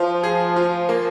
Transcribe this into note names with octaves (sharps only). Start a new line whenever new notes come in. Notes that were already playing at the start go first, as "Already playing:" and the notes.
Already playing: F3 F4
G#4
F4
A#3